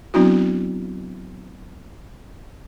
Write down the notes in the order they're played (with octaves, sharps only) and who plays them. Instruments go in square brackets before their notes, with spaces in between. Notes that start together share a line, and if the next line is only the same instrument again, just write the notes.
[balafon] F#3 B3 C4 D4 E4 F#4